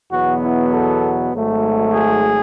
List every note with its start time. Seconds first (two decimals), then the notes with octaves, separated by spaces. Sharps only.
0.11 E2 B2 F#3 B3 F#4
0.42 E4
0.72 A4
1.32 G#1 G#2 F#3 A3
1.93 G#4